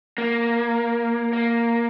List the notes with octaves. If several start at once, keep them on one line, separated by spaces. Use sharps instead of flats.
A#3
A#3